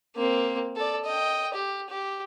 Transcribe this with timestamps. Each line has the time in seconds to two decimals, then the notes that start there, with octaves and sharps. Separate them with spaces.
0.16 A#3 C4
0.76 A4 D5
1.04 D#5 G5
1.54 G4
1.89 G4